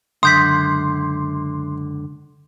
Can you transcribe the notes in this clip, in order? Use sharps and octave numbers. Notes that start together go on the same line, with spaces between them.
C#2 F#2 D3 C6 D#6 G6 B6